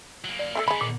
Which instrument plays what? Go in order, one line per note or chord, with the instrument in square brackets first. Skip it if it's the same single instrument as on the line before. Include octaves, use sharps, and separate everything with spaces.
[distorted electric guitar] F#3 A#3
[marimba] D5
[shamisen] A3 G4 A4
[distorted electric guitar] D#3 B3 [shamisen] G#3 B5
[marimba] A#2